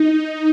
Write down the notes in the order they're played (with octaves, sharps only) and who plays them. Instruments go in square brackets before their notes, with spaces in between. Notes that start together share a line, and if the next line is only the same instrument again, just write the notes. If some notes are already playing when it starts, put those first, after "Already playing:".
Already playing: [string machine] D#4